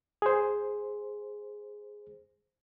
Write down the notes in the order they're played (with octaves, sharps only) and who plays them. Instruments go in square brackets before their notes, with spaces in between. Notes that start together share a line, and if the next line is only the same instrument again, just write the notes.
[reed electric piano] G#4 C5